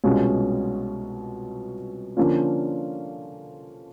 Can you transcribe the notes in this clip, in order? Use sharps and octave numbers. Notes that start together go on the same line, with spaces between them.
C2 B2 G#3 C#4 F4
D3 F3 A#3 C#4 F4